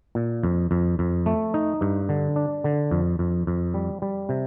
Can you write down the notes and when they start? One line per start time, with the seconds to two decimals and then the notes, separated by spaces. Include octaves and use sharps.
0.15 A#2
0.43 F2
0.71 F2
0.99 F2
1.26 A3
1.54 D#4
1.81 G2
2.09 D3
2.36 D4
2.64 D3
2.91 F2
3.19 F2
3.47 F2
3.74 G3
4.02 G3
4.29 C3